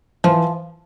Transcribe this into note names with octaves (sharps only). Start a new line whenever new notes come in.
E3 F3